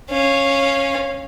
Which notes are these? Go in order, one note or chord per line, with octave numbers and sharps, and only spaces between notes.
C#4 F5